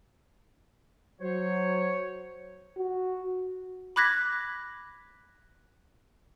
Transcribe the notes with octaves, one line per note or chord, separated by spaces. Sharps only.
F#3 C5 C#5
F#4
B5 D6 F#6 G#6 A#6 B6